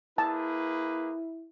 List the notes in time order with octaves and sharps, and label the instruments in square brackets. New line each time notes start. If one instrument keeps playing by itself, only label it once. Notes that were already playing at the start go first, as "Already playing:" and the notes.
[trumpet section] A#3 G#4 B4 [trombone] E4 [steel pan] A5